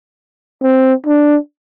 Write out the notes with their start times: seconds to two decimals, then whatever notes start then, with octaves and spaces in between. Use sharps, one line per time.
0.63 C4
1.07 D4